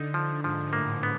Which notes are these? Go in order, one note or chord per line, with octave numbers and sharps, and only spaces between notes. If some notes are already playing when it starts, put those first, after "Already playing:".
Already playing: D3 D#4
F3
G#2 F3
A2 A#3
B3